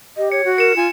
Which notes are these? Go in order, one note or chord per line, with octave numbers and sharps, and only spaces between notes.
G4 D#5
C#5 C#7
F#4
A#4 C#7 E7
F4 G#5